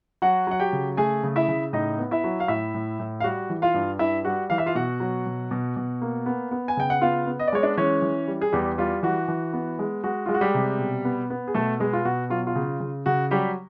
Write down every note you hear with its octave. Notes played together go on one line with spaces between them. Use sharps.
F#3 F#4 F#5
F#3 F#5
G4 G5
C#3
A3 G#4 G#5
C#3
E4 E5
C#3
A2 D#4 D#5
B3
E4 E5
F#3
F5
A2 E4 E5
A2
A2
F5
G3 F#4 F#5
E3
F4 F5
G2
G2 E4 E5
G3 F#4 F#5
E3 F5
E5
F4 F5
B2 F#4 F#5
F#3
B2
B2
B2
A#3
B3
B3
G#5
C#3 G5
F#5
B3 F4 F5
B3
D#5
D5
G#3 C#5
D4 D5
E3 C#4 C#5
E3
G3
G#4
E2 G3 G4
G3 F4
E3 F#4
E3
B3
G#3
G#3 F#4
G#3 F4
F#4
G3 G4
C3
B2
B3
B3
G#4
B2 A3 A4
G#3 B3 G#4
F4
B2 F#4
F#3 F4
F4
C#3
C#3
C#3 F#4
F#3 G3 G4